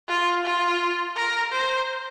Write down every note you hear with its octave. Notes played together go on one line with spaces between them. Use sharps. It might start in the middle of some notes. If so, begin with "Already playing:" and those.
F4
F4
A#4
C5